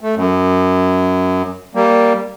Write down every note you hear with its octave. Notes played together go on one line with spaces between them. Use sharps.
A3
F#2
G3 A#3